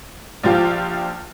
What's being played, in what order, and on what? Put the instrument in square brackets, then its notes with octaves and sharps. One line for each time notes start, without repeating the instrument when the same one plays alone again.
[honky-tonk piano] A#1 F3 F4 G4